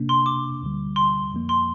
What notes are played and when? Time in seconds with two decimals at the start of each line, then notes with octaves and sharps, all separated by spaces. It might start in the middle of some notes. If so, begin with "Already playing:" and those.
Already playing: C3 A#3 D4
0.09 C6
0.26 D6
0.62 D2 D3 G3
0.96 C6
1.32 F2 F3 A#3
1.49 C6